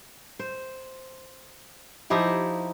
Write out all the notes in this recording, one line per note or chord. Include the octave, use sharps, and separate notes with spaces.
C5
F3 D#4 E4 G4